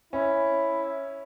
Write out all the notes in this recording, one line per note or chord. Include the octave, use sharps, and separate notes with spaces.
C#4 E4